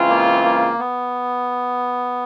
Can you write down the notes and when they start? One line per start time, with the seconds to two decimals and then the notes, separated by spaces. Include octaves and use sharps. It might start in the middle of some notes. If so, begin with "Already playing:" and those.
Already playing: C#3 E3 G#3 C4 F4
0.09 A#3
0.44 A#3
0.79 B3